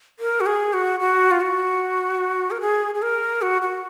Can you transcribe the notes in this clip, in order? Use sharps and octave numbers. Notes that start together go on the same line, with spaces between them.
A#4
F#4
G#4
F#4
F#4
F4
F#4
A#4
G#4
G#4
A#4
F#4
F#4